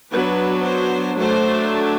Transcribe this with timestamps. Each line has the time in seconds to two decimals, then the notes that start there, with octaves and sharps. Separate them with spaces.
0.11 F#3 B3 D4 B4
0.65 C5
1.19 F#3 A3 D4 C5